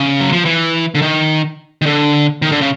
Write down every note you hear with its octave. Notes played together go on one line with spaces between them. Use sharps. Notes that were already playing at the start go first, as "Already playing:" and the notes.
Already playing: C#3
F#3
F3
E3
D3
D#3
D#3
D3
D#3
D3
C#3